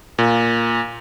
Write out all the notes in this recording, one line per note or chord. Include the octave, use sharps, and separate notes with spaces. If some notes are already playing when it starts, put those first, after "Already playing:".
A#2